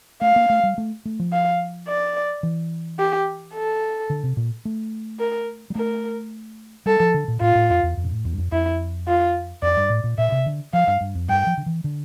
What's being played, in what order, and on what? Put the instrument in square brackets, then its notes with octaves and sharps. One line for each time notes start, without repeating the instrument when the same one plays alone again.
[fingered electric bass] A3 [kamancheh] F5
[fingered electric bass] A#3
A3
G3
A3
A3
F3
[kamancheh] F5
D5
[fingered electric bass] E3
[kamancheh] G4
A4
[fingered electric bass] D3
C3
A#2
A3
[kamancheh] A#4
[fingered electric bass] G3
[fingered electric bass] A3 [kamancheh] A#4
[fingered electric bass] G3 [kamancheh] A4
[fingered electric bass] F3
D3
A#2
[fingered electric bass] A2 [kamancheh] F4
[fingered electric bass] A2
F2
E2
F2
A#2
A2
E2
G2
F2
[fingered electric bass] F2 [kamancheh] E4
[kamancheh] F4
[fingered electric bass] F2 [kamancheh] D5
[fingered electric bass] G2
A2
A#2
[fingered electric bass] A#2 [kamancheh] E5
[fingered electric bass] C3
D3
[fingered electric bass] F3 [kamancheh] F5
[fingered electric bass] G2
G2
F2
[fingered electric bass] G2 [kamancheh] G5
[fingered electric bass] F3
D3
E3
D3